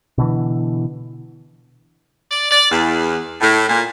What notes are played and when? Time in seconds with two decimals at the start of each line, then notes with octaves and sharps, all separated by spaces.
0.18 B2 D3 E3
2.32 D5
2.51 D5
2.71 E2
3.41 A2
3.69 A#2